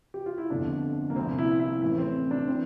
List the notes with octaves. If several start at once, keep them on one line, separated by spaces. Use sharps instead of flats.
G4
F4
E4
G1 F2 D3 F3 D4
A#3
C2 A#2 F3 C4
E4
E4
A1 A2 E3 E4
C4
D4
E3 C4